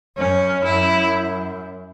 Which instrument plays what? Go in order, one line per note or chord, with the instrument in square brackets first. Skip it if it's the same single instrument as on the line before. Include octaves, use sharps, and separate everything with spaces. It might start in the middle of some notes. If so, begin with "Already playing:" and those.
[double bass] F#2 [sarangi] C#4
[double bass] F#2 [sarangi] E4